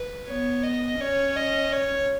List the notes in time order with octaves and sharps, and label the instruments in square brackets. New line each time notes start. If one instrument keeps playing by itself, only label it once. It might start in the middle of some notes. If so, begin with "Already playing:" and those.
Already playing: [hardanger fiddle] B4
[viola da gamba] B3 [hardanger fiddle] C#5
[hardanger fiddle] D#5
[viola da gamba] C#4 [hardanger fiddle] C#5
[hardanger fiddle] D#5
C#5